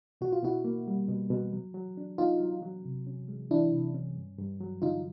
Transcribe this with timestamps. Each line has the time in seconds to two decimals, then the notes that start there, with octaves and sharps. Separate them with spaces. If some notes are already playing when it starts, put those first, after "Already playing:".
0.21 B2 F#4
0.32 F4
0.43 B2 E4 F#4
0.64 A#3
0.87 G3
1.08 B2
1.31 B2
1.53 F#3
1.74 F#3
1.97 D4
2.18 B3 D#4 F4
2.40 F#3
2.62 F#3
2.85 C3
3.07 C#4
3.28 G#3
3.50 E3 D4 E4
3.72 C3
3.94 C#4
4.16 G2
4.38 G2
4.61 F#3
4.82 D3 D#4 F4